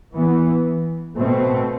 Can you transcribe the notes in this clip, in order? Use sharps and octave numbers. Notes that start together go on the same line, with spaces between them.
E3 B3
B2 A3 C4